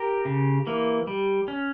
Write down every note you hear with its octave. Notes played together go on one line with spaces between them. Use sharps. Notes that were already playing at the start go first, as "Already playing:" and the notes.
Already playing: G4 A#4
C#3
E3 A#3
G3
C#4